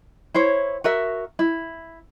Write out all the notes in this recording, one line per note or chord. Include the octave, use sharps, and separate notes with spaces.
E4 C5 C#5
F#4 A#4 E5
E4